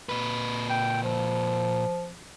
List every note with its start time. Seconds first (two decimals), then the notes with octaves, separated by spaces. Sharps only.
0.09 A#2 B4
0.70 G5
1.03 F3